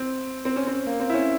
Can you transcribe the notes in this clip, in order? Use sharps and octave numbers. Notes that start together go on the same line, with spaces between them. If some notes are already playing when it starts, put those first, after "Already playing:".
Already playing: C4
C4
C#4
C4
A#3
C4
E4
C#4